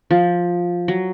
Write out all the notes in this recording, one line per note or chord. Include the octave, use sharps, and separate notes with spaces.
F3
F#3